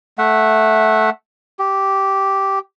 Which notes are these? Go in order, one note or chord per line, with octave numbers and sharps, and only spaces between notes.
A3 E5 F#5
G4